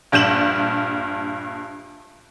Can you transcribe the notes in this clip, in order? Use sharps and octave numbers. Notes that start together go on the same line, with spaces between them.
A#1 G2 G6 E7 F#7